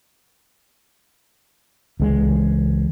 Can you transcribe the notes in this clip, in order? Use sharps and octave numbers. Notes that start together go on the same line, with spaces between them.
C#2 E3 G#3